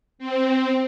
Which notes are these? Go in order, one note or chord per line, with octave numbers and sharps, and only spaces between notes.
C4